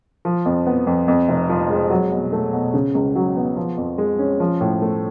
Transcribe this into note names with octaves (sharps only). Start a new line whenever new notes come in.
F3
F2
B3
F2
F2
F1
F3
G#3
F#3
B2
A3
B2
C#3
C#2
F#3
B3
F3
F2
G#3
C#4
F3
A2
A3